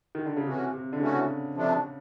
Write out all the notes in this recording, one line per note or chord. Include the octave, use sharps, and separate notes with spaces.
D#3
D3
C#3
C3 E3 A3 C#4 F#4
C3
D3
C#3 E3 A3 C#4 F#4
C3 F3 A3 D4